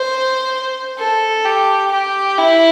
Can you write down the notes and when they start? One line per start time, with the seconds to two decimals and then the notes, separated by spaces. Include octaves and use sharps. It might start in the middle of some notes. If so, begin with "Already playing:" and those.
Already playing: C5
0.99 A4
1.45 G4
1.91 G4
2.38 E4